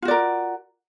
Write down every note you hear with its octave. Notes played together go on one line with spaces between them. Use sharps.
F4 F#4 A#4 D5